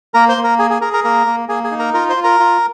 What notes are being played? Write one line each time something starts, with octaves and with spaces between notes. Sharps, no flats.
A#3 A#4 A#5
C5 C6
A#3
A#4 A#5
G#4 G#5
G#4 G#5
G#4 A#4 A#5
A#4 A#5
A#3 A#4 A#5
A#3
A#3 G#4 G#5
G#4 G#5
D#4
A#4 A#5
F4 A#4 A#5
C5 C6
F4
A#4 A#5
F4